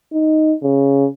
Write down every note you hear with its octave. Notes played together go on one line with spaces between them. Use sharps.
D#4
C#3